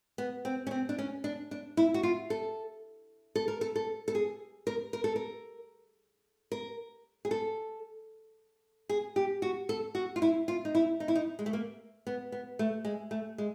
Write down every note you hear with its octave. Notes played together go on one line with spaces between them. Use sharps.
B3
C4
C#4
C4
D4
C#4
D4
D4
E4
F#4
F4
A4
A4
A#4
A4
A4
A4
G#4
A#4
A#4
A4
A#4
A#4
G#4
A4
G#4
G4
F#4
A4
F#4
F4
E4
F4
D#4
E4
D#4
E4
D#4
G#3
A3
A#3
B3
B3
A3
G#3
A3
G#3